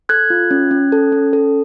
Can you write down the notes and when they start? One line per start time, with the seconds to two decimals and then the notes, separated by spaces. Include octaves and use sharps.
0.09 A4 F#6 G#6
0.30 F4
0.51 C#4
0.71 C#4
0.92 A4
1.12 C#4
1.33 A4